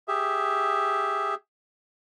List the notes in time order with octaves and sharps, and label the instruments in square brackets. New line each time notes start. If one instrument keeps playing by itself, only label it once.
[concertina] G4 G#4 E5